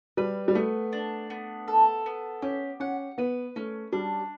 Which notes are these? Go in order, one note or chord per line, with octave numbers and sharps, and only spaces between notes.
G3 B4
G3
A3 B3
D4
B3
A4
B3
C#4 G4
C#4 F#5
B3 B4
A3 C#4
G3 D4